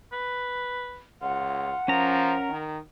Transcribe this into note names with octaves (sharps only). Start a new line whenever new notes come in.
B4
C#2 F4 F#5
F3 C#4 A#4 A#5
D#3